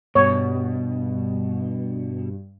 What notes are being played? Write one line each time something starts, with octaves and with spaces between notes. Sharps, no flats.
G2 B2 C#5